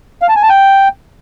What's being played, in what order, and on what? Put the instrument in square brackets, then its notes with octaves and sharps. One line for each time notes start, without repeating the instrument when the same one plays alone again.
[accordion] F5
A5
G#5
A5
G5